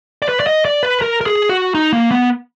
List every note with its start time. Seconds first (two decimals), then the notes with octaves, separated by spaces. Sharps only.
0.22 D5
0.29 B4
0.40 D5
0.47 D#5
0.65 D5
0.83 B4
1.02 A#4
1.21 A#4
1.26 G#4
1.49 F#4
1.75 D#4
1.93 A#3
2.11 B3